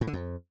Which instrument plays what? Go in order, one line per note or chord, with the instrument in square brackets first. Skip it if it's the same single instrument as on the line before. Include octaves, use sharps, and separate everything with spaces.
[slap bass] A2
D3
F2